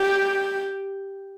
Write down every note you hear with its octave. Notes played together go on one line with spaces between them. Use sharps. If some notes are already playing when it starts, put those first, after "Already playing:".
Already playing: G4